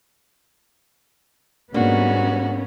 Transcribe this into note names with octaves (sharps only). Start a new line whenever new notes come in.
G#2 G3 A#3 B3 C#4 D4 F#4